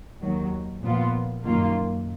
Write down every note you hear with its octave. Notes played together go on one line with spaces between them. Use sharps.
D#2 D#3 F#3
A#2 F3 B3 F4
F#2 D#3 A#3 F4